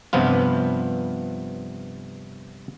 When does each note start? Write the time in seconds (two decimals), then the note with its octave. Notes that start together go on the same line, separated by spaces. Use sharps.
0.13 G2 C3 F3 B3 F4